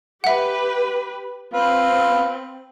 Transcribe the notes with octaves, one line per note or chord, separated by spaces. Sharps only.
G4 B4 E5 F#5
C4 F4 B4